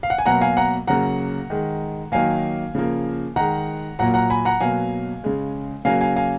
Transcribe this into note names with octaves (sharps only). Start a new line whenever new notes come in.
F5
F#5
G#5
B2 F#3 A#3 F#5 A#5
F5 G#5
F#5 A#5
C#3 F#3 A#3 F#5 A#5
D#3 G#3
D#3 F#3 A#3 F5 G#5
C#3 F3 A#3
D#3 G#3 F#5 A#5
A#2 F#3 A#3 F#5 A#5
F#5 A#5
G#5 B5
F#5 A#5
B2 F#3 A#3 F5 G#5
C#3 G#3
C#3 F#3 A#3 F5 G#5
F5 G#5
F5 G#5